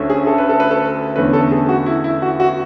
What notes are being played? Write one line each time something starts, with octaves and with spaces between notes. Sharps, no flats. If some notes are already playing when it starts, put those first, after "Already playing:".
Already playing: D2 D3 A3 C#4
G#4
A4
B4
A4
B4
A4
E2 D3 A3 C#4 B4
A4
G#4
F#4
E4
E4
F#4
F#4